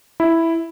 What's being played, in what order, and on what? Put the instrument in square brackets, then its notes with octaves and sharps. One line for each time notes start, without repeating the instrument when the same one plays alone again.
[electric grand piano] E4